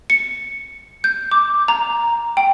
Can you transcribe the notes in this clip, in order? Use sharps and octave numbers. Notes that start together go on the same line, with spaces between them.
C#7
G6
D6
A#5
G5